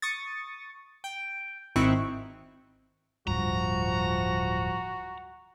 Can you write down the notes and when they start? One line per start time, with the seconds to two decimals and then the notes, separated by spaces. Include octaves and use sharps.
0.02 C#6 D#6 A6
1.04 G5
1.76 G#1 C4 D#4 E4 C#6 F#6
3.27 D1 G2 F3 F#4 A#5